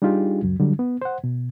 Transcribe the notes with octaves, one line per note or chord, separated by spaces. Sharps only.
G3 D4 D#4 F4 G4 G#4
C#2 F#2 F#3
D3 F#3 G3
B3
C5 F#5
B2